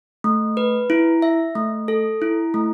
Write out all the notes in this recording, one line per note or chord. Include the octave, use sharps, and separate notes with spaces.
A3
B4
E4
E5
A3
A4
E4
A3